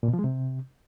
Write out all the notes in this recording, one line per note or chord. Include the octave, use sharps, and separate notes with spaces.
A#2
B2
F3
G#3
C3